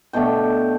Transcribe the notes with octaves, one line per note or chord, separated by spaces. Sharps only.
B2 A3 D4 G5